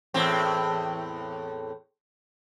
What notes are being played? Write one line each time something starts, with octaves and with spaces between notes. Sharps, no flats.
E2 A2 C4